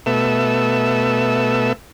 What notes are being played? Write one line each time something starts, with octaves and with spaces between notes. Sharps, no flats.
B2 A3 E5